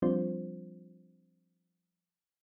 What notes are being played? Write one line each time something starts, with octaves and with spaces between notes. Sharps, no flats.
F3 G3 C4 D4 F4 C5